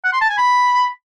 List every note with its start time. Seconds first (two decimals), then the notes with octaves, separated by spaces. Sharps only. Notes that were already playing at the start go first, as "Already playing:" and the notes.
0.04 F#5
0.13 C6
0.21 A5
0.29 G#5
0.38 B5